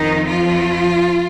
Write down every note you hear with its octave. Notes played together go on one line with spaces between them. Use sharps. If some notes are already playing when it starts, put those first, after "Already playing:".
Already playing: F2 D#3 D#4
F3 F4